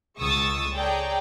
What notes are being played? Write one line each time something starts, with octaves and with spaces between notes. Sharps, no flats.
C#2 G#3 C#6 D#6 E6 A6
G#4 A4 C#5 D5 G5 A#5